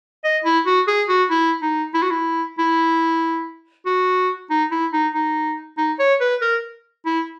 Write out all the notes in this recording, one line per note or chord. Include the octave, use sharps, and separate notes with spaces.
D#5
E4
F#4
G#4
F#4
E4
D#4
E4
F#4
E4
E4
F#4
D#4
E4
D#4
D#4
D#4
C#5
B4
A#4
E4